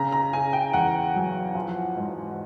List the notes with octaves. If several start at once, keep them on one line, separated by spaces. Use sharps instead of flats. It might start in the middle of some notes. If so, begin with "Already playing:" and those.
Already playing: C#3 A#5
A#5
C#3 G#5
G5
E2 F#5
F#3
F3
G#2